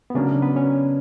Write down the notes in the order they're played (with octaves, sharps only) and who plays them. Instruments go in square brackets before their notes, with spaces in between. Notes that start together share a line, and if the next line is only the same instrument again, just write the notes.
[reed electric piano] B3
[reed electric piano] C#3 C#4 [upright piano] F#3 A#3 D4
[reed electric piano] B3 B4
C#4 C#5